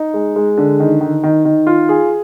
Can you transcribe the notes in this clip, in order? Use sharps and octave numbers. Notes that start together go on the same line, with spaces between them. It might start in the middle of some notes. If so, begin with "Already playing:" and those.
Already playing: D#4
G#3
G#3
D3
D#3
D#3
D#3
D#3
F4
G#4